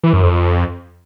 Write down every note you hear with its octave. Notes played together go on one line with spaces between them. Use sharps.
E3
F#2
F2